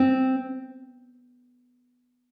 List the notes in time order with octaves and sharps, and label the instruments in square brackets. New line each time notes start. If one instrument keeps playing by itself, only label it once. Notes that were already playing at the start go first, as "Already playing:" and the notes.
Already playing: [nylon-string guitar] C4